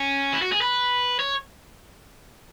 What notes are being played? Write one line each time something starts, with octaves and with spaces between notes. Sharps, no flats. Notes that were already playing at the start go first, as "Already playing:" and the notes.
Already playing: C#4
E4
F#4
G#4
B4
C#5